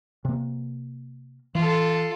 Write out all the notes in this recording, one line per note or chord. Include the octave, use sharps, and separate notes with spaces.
C3 A#3
E3 F4 A4